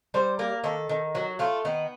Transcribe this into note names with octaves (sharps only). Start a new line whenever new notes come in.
G3 C5
A#3 A#4
D#3 A4
D#3
F#3 F#4
A3 F4
D#3 B3